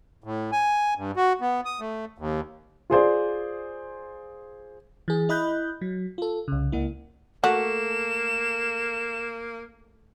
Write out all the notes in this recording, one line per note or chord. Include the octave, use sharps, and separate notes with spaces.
A2
G#5
G2
F#4
B3
D#6
A3
D#2
F4 G#4 C5 D5
E3 G#4
E4 D#5 B5 F#6 G6
F#3
F4 A4
C2 C#3
C#2 A#3 E4
A3 A#3 F#4 E7